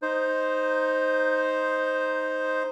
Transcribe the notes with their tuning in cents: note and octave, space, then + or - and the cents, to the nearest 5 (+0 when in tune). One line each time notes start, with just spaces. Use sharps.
D#4 +0 C5 +0